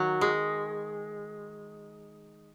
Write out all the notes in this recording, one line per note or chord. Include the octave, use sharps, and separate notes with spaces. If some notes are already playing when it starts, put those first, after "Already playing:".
Already playing: D#3 F#3
G#3